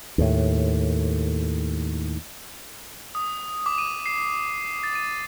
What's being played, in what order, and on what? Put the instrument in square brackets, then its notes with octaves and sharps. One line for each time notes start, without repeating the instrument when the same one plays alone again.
[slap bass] D#2 A2
[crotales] D#6
D6
D#7
C7
A6
D#7